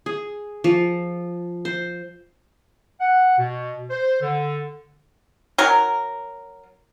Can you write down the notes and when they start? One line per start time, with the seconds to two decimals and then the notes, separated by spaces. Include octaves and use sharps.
0.06 G#4
0.64 F3
1.65 C5
3.00 F#5
3.37 B2
3.90 C5
4.21 D3
5.58 F#3 A#4